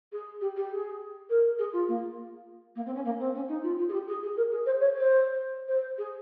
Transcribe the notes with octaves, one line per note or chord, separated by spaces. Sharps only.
G#4
G4
G4
G#4
A#4
G#4
F4
A#3
A#3
C4
C#4
A#3
C4
C#4
D#4
F4
F4
G#4
G4
G#4
G#4
A#4
G#4
C5
C#5
C5
C5
G#4